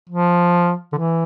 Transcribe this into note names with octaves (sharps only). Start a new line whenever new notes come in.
F3
D3
E3